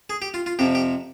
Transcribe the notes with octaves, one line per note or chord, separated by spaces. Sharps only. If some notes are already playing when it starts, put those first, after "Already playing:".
G#4
G4
F4
F4
F2 C3 F3 G4
G4